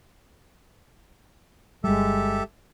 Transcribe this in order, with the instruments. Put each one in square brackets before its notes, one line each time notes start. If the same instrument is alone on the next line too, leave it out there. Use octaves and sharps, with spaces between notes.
[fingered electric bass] G1 G3 [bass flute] G#3 [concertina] G4 A4 E5